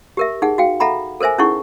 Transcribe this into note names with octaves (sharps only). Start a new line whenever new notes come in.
G4 A#4 E5
D#4 G#4 F#5
F#4 F5 G5
A4 E5 F#5 A#5 B5
A4 A#4 C5 E5 G#5
C#4 D#4 E4 G#4 F#5 C#6